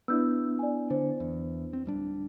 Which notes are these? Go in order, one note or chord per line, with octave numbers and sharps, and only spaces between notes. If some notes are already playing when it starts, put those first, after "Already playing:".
B3 D4 E4 E6 G6
D5 G#5
D3 C5
E2
C4
D1 G3 D4